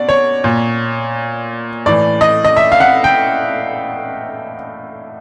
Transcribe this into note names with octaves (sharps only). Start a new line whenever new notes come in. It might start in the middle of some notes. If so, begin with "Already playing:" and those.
Already playing: B2 D5
C#5
A#2
A2 E3 D5
D#5
D#5
E5
F5
F#5
G5